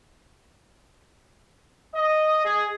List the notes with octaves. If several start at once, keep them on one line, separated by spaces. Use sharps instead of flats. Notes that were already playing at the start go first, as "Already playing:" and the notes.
D#5
G#4